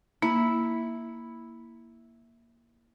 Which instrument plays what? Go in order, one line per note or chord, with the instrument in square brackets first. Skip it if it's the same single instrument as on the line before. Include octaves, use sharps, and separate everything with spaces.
[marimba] A#3 [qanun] E4